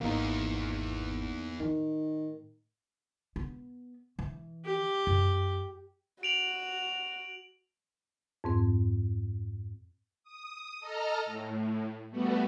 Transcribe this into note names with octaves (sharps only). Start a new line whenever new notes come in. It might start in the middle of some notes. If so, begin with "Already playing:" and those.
G#1 E2 A#3 D#4
A2 D#3
B3
E3
G4
F#2
F#4 D7 F7 F#7
F2 G#2 C4
D#6
A4 D#5 A#5 F6
A2
G3 A3 B3 F#4